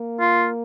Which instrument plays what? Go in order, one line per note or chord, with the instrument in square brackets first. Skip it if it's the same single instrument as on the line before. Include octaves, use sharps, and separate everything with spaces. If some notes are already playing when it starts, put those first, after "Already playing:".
Already playing: [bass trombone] A#3
[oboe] F4